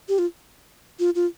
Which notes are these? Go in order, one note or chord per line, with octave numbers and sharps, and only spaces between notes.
G4
F4
F4
F4